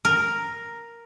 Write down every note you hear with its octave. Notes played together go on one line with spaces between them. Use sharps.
A#4